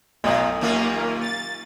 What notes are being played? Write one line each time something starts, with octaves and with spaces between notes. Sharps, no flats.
B1 A2 D#5
D#2 A#3 C#4 F4
A6